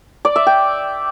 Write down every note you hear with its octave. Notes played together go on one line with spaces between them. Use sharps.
D5
E5
G5